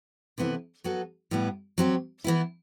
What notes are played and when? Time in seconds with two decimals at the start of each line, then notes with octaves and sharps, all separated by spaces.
0.38 C3 E3 B3 E4 A4
0.84 F#3 B3 F#4 A4
1.31 A2 G3 B3 E4
1.78 F#3 C4 G4
2.24 E3 B3 E4